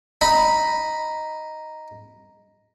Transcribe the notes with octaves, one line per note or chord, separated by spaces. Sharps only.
D#4 B5